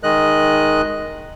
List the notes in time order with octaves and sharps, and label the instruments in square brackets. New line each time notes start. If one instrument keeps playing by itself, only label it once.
[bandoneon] D#3 G#3 D#5 F#6